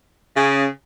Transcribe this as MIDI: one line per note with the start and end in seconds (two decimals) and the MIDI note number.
0.35 0.65 49